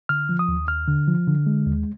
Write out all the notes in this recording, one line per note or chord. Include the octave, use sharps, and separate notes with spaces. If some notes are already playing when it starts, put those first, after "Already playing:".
D3 F6
F3
D#6
D#2
D#2 F6
D3
F3
D3
G#3
D#2